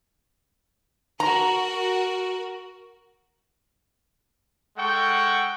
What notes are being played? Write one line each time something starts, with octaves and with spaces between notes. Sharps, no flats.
F#4 A#4 A#5
G#3 A4 F#5 G5 C#6